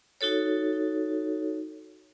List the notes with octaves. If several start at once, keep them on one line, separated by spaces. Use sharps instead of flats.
D#4 F#4 A4 C#5